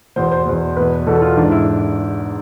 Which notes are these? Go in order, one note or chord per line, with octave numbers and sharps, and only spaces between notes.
E2 B2 C5
C5
E2 B2
E2 B2 B4
E2 B2 A4
F4
G#2 E3 D4
E4